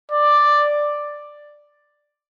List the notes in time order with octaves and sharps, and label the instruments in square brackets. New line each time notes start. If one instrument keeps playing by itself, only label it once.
[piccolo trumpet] D5